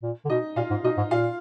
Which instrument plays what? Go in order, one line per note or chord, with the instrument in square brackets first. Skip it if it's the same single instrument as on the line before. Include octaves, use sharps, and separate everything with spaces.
[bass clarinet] A#2
D3
[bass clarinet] B2 [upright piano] D#4 D#5
[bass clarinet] A#2 [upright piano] F4 F5
[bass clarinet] G#2
[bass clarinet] B2 [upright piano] D#4 D#5
[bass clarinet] G#2
[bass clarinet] A#2 [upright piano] F4 F5